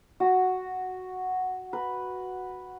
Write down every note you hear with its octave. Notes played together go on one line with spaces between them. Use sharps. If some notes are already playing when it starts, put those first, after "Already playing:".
F#4
B4